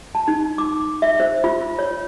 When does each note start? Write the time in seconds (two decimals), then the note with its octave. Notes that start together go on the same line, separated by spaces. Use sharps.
0.15 A5
0.28 D#4
0.58 D6
1.02 E5
1.20 C5
1.44 F4
1.79 C#5